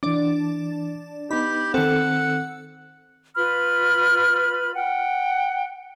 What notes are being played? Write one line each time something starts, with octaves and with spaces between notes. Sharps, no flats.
E3 D4 D5 D6
B3 D#4 G4 B5
D#3 C4 A4 F#5 C#7
F4 B4 B5 F6
F#5 G5